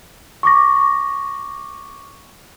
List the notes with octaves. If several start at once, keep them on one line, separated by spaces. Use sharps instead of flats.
C#6 D6 A#6